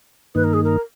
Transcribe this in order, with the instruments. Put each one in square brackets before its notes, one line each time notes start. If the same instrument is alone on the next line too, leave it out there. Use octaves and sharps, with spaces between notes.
[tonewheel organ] G2 D#3 A#3 D#4 [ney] B4
[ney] A#4
G#4
A#4